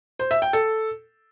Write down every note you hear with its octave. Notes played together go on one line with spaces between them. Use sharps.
C5
E5
G5
A4